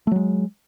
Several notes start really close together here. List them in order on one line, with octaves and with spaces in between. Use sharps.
A3 F#3 G#3